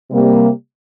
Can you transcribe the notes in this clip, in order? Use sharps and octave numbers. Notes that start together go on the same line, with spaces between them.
C3 G3 A#3